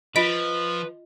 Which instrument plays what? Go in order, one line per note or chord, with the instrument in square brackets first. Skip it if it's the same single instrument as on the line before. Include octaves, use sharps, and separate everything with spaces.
[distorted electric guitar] F3 [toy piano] F4 D#5 [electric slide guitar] B4 [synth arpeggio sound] B6 D7